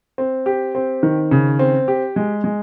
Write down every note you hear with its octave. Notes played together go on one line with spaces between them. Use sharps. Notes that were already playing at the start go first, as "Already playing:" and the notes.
C4
G4
C4
D#3
C#3
C4
G4
G#3
G#3